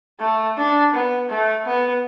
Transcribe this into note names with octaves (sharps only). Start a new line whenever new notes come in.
A3
D4
B3
A3
B3